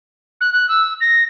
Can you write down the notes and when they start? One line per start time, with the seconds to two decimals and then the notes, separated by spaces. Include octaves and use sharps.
0.41 F#6
0.53 F#6
0.69 E6
1.01 A#6